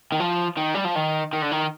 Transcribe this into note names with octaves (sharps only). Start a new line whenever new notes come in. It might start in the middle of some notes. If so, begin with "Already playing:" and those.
D#3
F3
D#3
G3
F3
D#3
D#3
D3
D#3